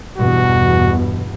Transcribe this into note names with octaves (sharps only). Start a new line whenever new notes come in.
E2 G2 B2 F#4